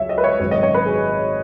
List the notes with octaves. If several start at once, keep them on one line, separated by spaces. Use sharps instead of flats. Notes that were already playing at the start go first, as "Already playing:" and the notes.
Already playing: C#2 C#3 F#3 C#5 E5
D#5
B4
C#5
G#1 F#2 C#3 C#5
D#5
C#5
B4
G#4